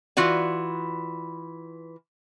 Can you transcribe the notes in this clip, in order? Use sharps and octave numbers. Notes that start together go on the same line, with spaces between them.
E3 F4 F#4 D5